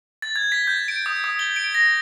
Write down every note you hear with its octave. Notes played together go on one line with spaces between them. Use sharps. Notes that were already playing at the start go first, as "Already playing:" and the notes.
A6
G#6
B6
G6
D7
D#6
D#6
G7
D7
A#6